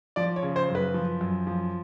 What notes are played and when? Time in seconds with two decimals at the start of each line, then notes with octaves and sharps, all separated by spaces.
0.16 F3 D5
0.36 C#5
0.43 C#3
0.56 C5
0.69 F#2
0.75 B4
0.94 F3
1.21 F#2
1.47 F3